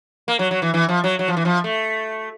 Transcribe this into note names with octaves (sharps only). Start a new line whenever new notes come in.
A#3
F#3
F#3
E3
E3
F3
F#3
F#3
F3
E3
F3
A3